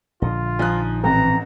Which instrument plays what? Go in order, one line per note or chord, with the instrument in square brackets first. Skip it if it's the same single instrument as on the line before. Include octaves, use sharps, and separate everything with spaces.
[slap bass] A#1 D3 [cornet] F4 [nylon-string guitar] D#5
[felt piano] F3 F#6 [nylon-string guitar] D#4 D#5 G#5
[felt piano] A1 [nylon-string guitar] E3 C4 A4 [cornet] A#5